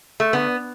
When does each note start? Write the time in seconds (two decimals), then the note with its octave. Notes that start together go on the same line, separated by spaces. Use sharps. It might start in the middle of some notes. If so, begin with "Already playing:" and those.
0.20 A3
0.33 D3 A3 B3